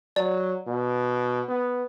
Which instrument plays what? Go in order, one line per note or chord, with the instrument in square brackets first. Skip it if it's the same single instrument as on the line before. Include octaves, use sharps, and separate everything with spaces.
[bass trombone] F#3 [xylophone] D5
[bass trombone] B2
B3